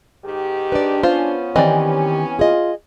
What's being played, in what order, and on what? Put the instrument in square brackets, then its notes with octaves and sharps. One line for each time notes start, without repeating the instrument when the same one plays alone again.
[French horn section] G#2 D#3 G4
[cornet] D4 [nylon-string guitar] B4 D5
[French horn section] B3 C#4 [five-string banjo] F4 [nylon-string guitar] C5
[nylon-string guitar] D#3 D#5 [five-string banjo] E3 C4 D5 [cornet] G4
[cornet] F4 [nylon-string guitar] G#4 D#5